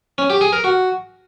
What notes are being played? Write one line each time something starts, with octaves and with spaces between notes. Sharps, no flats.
C#4
G4
G#4
A#4
F#4